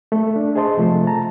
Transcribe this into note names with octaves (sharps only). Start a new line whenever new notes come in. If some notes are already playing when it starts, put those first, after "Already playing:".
A3
D4
G#4 C5 D#5 A5 C6
C3 F3 A3
A5 A#5